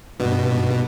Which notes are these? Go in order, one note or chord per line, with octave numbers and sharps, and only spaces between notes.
G2 B2